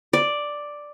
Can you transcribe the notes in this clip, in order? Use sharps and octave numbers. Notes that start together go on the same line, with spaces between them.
D5